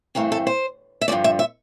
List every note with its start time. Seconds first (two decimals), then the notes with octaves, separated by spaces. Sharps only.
0.15 G2 E3 A3 C4 A#4
0.32 A4
0.47 C5
1.01 E5
1.08 G2 D3 F3 A3 D5
1.24 E5
1.39 E5